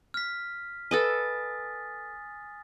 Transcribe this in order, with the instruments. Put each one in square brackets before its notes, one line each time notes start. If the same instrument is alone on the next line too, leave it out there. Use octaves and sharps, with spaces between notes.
[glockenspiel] F6 B6
[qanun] A4 B4 D#5 [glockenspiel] G#5 D#6 A6